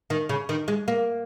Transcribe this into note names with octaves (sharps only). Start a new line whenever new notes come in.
D#3
C#3
D#3
G#3
A#3